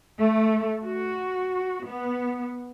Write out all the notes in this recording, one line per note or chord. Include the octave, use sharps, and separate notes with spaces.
A3
F#4
B3